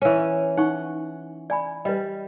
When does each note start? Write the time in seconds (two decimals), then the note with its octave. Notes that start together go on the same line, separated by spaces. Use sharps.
0.02 E3 C#4
0.57 D#4 F#5 C#6
1.50 D5 G#5 B5
1.85 G3 B4 D#5